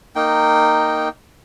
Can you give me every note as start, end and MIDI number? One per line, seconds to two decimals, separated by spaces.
0.16 1.09 58
0.16 1.09 63
0.16 1.09 79